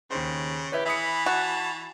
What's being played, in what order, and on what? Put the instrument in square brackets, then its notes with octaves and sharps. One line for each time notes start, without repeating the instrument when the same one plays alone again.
[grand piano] D#2 C5 [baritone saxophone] C#3
[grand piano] E4 B4 C#5 [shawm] G4
[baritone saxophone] E3 [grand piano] E5 D#6 C#7 [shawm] B5
[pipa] F#4 [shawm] A5